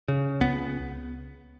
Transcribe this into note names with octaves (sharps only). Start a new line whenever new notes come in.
C#3
C#2 B3